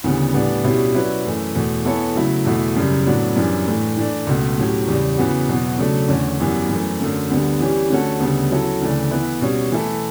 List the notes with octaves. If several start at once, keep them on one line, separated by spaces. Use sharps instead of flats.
D2 C#3 E3 G3 B3
A2 E3 G3 B3 D4
B2 G3 C#4 E4 G4
F#3 C#4 E4 B4 D5
F#2 E3 A3
E2 B2 A3
E3 B3 E4 A4 C#5
C#3 F#3 A3 E4
E2 B2 A3 E4
F#2 C#3 G3
A2 F#3 B3 D4
F#2 E3 G3 D4
A2 E3 A3 D4
E3 A3 D4
C#2 B2 A3
A2 F#3 C#4 G4
E2 C#3 G3
C#3 E3 B3 F#4
E2 B2 F#3 B3
C#3 F#3 A3 D4 A4
E2 D3 A3 C#4
F#2 E3 G3 B3
F#2 E3 A3
F#2 D3 A3
D2 D3 G3 B3
E3 G3 C#4 G4
D3 A3 C#4 F#4 A4
D2 C#3 G3 B3
F#3 C#4 E4 A4
D2 C#3 E3 A3 D4
E3 B3 E4 B4
B2 G3 C#4
E3 A3 E4 A4